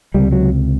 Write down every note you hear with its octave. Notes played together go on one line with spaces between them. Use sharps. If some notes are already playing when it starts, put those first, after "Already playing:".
C#2 C3 G3
F#3